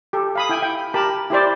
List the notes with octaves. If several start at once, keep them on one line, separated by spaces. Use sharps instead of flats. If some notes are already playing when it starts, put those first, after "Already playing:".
G4 A4
F5 B5 D#6
E4 G5 G#5
G5
G4 A#4 A5 B5
E4 G4 C5 D5